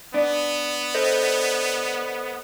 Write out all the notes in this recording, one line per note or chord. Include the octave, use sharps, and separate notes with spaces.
B3 D4
A4 C5 D#5